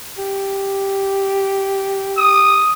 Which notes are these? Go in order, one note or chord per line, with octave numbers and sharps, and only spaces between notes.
G4
D#6